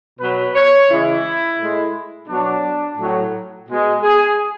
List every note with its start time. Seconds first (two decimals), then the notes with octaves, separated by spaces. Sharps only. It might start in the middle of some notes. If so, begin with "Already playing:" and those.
0.20 B2 F#3 B4
0.55 C#5
0.90 C#3 E3 G#3 E4
1.59 A2 G#3
2.28 B2 F#3 D4
2.98 A2 F#3
3.68 B2 G#3
4.03 G#4